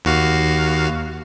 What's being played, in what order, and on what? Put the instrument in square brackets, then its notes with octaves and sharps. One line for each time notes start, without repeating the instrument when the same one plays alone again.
[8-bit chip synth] D#2 F#4 F5